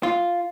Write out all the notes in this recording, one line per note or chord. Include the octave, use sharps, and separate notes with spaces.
F4